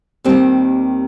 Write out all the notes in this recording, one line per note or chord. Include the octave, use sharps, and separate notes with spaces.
D#2 D#3 G3 C4